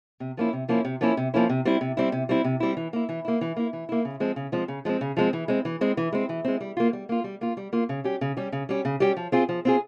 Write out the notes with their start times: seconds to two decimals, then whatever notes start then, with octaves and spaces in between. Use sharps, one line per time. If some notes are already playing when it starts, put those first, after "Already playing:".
0.20 C3
0.37 F3 A#3 C#4 E4
0.53 C3
0.69 F3 A#3 C#4 E4
0.85 C3
1.01 F3 A#3 C#4 E4
1.17 C3
1.34 F3 A#3 C#4 E4
1.49 C3
1.65 G3 C4 E4
1.81 C3
1.97 G3 C4 E4
2.12 C3
2.29 G3 C4 E4
2.44 C3
2.60 G3 C4 E4
2.77 E3
2.93 A#3 E4
3.09 E3
3.25 A#3 E4
3.41 E3
3.56 A#3 E4
3.73 E3
3.89 A#3 E4
4.05 C#3
4.20 F3 G#3 C4
4.36 C#3
4.52 F3 G#3 C4
4.68 C#3
4.85 F3 G#3 C4
5.01 C#3
5.17 F3 G#3 C4
5.33 E3
5.48 G#3 C4
5.65 E3
5.81 G#3 C4
5.97 E3
6.12 G#3 C4
6.29 E3
6.44 G#3 C4
6.60 G3
6.77 A#3 F4
6.93 G3
7.09 A#3 F4
7.24 G3
7.41 A#3 F4
7.57 G3
7.73 A#3 F4
7.89 C#3
8.04 G3 C#4 G4
8.21 C#3
8.37 G3 C#4 G4
8.52 C#3
8.69 G3 C#4 G4
8.85 C#3
9.00 G3 C#4 G4
9.17 F3
9.32 C4 F4 G#4
9.49 F3
9.65 C4 F4 G#4